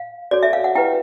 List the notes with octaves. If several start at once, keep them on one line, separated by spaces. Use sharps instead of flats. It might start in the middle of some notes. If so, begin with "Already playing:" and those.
Already playing: F5
F#4 A4 C#5 D5
E5
F5
F#5
E4 G4 B4 G5